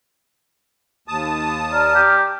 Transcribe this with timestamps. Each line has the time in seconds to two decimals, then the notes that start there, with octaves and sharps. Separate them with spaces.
1.08 D#2 A5 D#6
1.71 D5 A#5 F6
1.95 G4